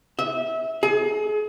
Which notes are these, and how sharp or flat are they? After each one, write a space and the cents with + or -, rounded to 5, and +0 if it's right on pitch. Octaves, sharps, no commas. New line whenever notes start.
E5 -25
G#4 +35